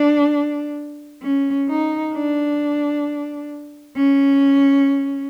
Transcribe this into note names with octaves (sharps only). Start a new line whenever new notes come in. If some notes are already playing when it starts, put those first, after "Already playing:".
Already playing: D4
C#4
D#4
D4
C#4